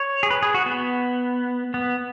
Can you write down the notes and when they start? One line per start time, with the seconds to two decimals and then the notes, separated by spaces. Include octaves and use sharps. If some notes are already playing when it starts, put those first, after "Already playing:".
Already playing: C#5
0.23 G#4
0.30 B4
0.43 G#4
0.54 F#4
0.66 B3
1.74 B3